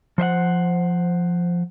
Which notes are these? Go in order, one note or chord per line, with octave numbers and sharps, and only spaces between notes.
F3 C5 E5 F#5